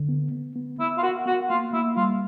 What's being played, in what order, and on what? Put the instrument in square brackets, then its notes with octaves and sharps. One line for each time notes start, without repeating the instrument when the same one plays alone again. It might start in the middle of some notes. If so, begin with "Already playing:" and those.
Already playing: [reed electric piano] D3
B3
B3
B3
[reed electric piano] B3 [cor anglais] E4
[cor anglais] F4
[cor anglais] F#4 [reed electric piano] A#4
[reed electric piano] B3 [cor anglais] F#4
[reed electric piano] A#3 [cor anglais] F4
[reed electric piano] A#3 [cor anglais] E4
[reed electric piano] G3 [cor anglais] F4